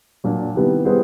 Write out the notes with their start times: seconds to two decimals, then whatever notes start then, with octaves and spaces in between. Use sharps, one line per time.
0.24 A#2 F#3 A#3 D4
0.54 C3 D#3 G3 B3 E4
0.85 G3 B3 E4 G#4 C5